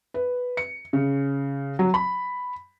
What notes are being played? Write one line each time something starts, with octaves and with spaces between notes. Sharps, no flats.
B4
C#7
C#3
F#3
B5